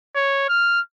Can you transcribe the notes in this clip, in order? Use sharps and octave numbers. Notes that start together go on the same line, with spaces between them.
C#5
F6